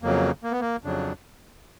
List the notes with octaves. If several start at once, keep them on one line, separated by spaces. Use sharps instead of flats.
F2 C#3 F#3 A#3
A#3
B3
A#3
F2 C#3 F#3 D4